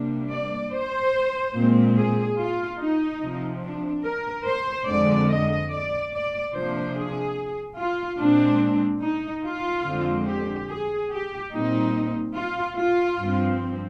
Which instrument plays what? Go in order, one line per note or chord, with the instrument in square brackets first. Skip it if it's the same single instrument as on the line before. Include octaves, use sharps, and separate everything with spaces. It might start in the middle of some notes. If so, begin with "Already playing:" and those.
Already playing: [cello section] C3 G3 A#3 D4
D5
C5
A#2 G#3 C4
G#4
F4
D#4
C3 F3 C4
D4
A#4
C5
F2 D3 G#3 D5
D#5
D5
D5
C3 F3 A#3 D4 C5
G#4
F4
A#2 G#3 C4 D4
D#4
F4
F2 D3 G#3 C4
G4
G#4
G4
A#2 G3 C4 D#4
F4
F4
G2 F3 C4